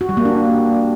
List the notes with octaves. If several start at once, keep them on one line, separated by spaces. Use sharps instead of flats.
F#4
G3
A#3
D4